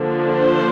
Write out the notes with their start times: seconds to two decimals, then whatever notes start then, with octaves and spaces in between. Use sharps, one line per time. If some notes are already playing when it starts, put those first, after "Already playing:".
Already playing: D3 F3 A#3 D4
0.30 C5